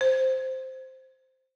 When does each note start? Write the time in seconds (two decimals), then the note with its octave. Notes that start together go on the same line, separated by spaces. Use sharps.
0.01 C5